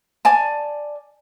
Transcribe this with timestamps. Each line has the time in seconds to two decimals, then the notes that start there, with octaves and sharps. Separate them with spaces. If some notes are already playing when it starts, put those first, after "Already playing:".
0.25 D5 G#5 A5